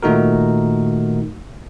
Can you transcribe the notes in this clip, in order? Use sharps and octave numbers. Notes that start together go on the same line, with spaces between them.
A#2 D#3 A3 D#4 F#4 A#4